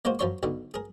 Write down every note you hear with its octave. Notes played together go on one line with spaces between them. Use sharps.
G#3 A#3 F4 F#4 C5
F#2 F3 F#3 C#5 C6 C#6
B1 B2 D3
G#4 A#4